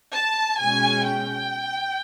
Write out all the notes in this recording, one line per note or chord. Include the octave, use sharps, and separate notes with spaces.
A5
B2 G#3 C#4 G#5
G5